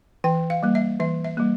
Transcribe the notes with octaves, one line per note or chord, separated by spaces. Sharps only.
E3 G5
F5
G3 A#3
E5
E3 E5
E5
G3 A#3